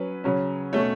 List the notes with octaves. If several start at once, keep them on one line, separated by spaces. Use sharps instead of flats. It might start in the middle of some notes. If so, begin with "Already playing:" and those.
Already playing: F#3 C#4 B4
C#3 F#3 C#4
B2 A3 C#4 C#5